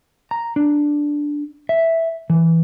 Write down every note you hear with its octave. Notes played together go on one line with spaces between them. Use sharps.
A#5
D4
E5
E3